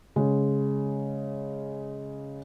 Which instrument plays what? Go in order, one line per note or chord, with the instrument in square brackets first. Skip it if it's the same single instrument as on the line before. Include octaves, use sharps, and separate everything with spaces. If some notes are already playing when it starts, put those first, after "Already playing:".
[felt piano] C#3 G#3